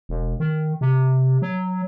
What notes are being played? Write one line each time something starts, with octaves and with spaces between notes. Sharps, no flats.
E1
D#3
C3
F#3